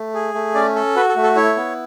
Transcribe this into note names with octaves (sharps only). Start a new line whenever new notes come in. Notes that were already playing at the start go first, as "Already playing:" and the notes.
Already playing: A3
G#4
A3
C#4 D5
A4
F#4 B4
A4
A3
A4
E4 C#5
B3